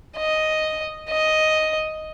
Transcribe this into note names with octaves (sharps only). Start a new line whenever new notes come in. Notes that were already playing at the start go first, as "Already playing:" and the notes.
D#5
D#5